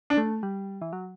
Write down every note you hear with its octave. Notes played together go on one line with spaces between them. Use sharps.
D4
A3
G3
E3
F#3